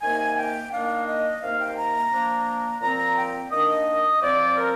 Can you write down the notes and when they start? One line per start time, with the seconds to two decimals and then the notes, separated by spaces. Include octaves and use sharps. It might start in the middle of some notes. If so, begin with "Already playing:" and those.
0.01 C3 D#3 A#3 G#5
0.36 G5
0.72 D#3 A#3 D4 F5
1.07 D#5
1.42 C3 D#3 A#3 F5
1.59 G5
1.77 A#5
2.12 F3 A#3 D4
2.81 A#2 F3 C4 A#5
3.17 G5
3.51 D#3 A#3 D4 D#5
4.22 F3 C4 D5
4.57 A#4